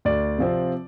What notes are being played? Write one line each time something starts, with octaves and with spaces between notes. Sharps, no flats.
D2 D5
C3 F3 C4